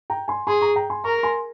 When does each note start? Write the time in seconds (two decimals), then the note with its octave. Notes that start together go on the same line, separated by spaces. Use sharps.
0.10 G5 A#5
0.28 G#5 C6
0.47 G#4 G#5 C6
0.61 A#5 C#6
0.76 G5 A#5
0.90 G#5 C6
1.04 A#4 A#5 C#6
1.23 G#5 C6